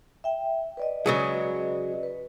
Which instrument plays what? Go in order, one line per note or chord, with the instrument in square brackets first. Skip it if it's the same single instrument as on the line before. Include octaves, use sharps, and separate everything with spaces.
[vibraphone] E5 G5
B4 D5 D#5
[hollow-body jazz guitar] C#3 F#3 G#3
[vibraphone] B4